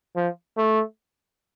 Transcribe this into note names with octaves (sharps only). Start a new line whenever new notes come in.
F3
A3